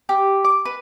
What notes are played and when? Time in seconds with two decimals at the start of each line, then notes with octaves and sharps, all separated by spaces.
0.09 G4
0.44 D6
0.65 B4